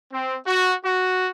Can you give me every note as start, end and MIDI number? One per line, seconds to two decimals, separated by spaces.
0.12 0.35 60
0.47 0.72 66
0.84 1.29 66